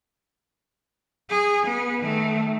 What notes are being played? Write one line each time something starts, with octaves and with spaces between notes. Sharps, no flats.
G#4
B3
D#3 A3